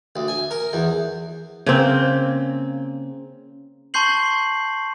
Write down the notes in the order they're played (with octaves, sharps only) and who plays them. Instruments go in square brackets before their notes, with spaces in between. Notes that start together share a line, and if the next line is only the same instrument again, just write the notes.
[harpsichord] D2
G#5
A#4
E2
[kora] C#3 A#3 C4
[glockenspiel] A5 C6 C#6 G6 C7 F#7